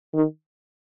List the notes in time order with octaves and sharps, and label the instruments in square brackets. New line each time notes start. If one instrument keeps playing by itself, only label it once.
[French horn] D#3